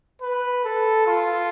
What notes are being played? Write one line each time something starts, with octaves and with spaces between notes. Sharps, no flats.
B4
A4
F4